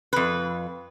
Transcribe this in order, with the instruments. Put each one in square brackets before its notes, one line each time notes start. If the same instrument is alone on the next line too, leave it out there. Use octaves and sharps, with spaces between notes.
[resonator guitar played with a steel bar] F2 B4